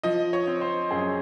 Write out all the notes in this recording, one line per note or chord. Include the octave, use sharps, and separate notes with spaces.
F3 D#5
C#5
C4
C5
F#2 G#4